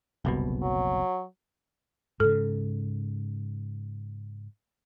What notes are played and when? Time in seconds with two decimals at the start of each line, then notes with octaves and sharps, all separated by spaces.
0.25 F#1 C2 B2
0.62 F#3
2.20 G#2 C#3 A4